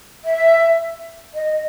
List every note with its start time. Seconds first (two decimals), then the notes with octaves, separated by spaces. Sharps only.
0.25 E5
1.34 D#5